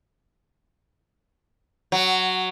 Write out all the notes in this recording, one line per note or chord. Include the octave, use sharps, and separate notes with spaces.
F#3